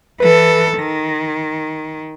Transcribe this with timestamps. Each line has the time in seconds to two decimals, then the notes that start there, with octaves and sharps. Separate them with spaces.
0.20 E3 A4 B4
0.79 D#3 A#6